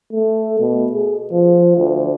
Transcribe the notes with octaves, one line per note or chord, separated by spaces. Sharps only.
A3
B2
G#4
F3
D2